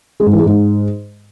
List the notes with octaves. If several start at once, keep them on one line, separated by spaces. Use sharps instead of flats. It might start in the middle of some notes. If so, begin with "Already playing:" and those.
G#3
G#2
E3
G#3
G#2